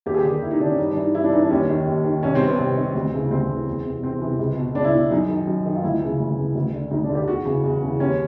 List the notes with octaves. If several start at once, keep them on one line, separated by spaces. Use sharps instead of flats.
D#2 G4
G#4
G4
D3
A#4
D#2 E4
D#4
D3 D4
C#4
G2 D#4
D4
E3
D#4
G2 E4
D4
E3 D#4
D4
D#2 C#4
D#3
D#2
D#3
C2 C#4
C4
C3 D#3
B3
C2 C4
C3 D#3
D2
C#3 E3
D2 C4
C#3 E3
E2
C3 E3
E2 C4
C3 E3
C#2
B2
C#2 D4
E4
B2
F#2 D#4
D#3
F#2
D#3
F4
D2 E4
C#3 E3
D2
C#3 E3
D2
D3
D2 D#4
D4
D3
G4
E2 F#4
C#3 E3
E2
C#3 E3
D#2 C#4